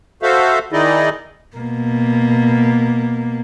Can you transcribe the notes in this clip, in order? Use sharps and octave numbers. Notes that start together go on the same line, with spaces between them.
F#4 A4 C5 E5 F5
D#3 D#4 E4 G#4 D5 D#5
B2 A#3